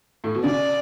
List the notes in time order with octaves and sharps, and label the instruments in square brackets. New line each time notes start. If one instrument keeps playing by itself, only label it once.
[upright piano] A2
B2
[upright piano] C#3 [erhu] D5